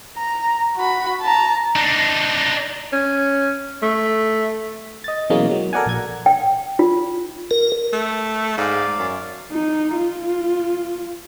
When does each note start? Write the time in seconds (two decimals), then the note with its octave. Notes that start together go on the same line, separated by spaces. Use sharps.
0.18 A#5
0.76 F#4 B5
1.21 A5 A#5
1.76 D4 D#4
2.93 C#4
3.82 A3
5.04 D#5 A6
5.30 B2 E3 F#3 G#3 A#3 C#4
5.51 F#3
5.73 A4 A#4 D5 F#5 G#5
5.86 A#1 G#6
6.26 G5
6.79 F4
7.51 A#4
7.93 A3
8.58 G#2 D5 F5
8.98 F#2
9.51 D#4
9.94 F4